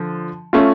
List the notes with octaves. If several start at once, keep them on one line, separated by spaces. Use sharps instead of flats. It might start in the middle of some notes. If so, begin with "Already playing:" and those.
Already playing: D3 F3
A3 C#4 F4